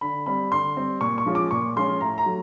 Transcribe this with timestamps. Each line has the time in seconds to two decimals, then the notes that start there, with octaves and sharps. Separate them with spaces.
0.01 D3 B5
0.26 G3 C4 B5
0.52 D3 C6
0.77 G3 C4
1.01 A#2 C#6
1.18 C#6
1.26 F3 G#3 C#4 F4
1.35 D6
1.51 A#2 C#6
1.76 F3 G#3 C#4 F4 C6
2.01 A2 A#5
2.18 A#5
2.26 F#3 A3